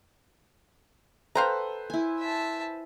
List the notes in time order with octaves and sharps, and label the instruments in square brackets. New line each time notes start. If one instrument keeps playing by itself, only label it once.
[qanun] A4 [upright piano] B4 C5 [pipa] F5 G5 A#5
[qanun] E4 G#5
[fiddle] E5 A5